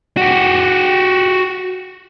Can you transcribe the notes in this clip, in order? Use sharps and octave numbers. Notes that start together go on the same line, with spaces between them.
F#4 G4